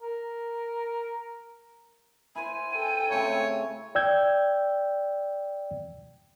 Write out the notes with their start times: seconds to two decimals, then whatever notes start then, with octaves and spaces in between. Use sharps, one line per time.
0.03 A#4
2.35 E4 C5 G#5
2.73 A4 G5
3.10 C#3 A3 C4 C#5
3.95 D5 G5 E6 G6 G#6